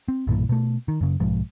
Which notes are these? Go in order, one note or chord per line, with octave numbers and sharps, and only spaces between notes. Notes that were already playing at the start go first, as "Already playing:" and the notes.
C4
B1 G2 A#2 E3
B2 A3
D#3
F#2 C#3
B1 G#2 F3 G#3